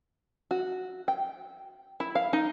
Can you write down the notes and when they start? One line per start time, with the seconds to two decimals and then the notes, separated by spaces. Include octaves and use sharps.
0.51 F#4
1.08 G5
2.00 E4
2.15 F5
2.33 D#4